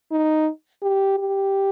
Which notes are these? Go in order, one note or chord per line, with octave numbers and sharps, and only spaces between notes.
D#4
G4
G4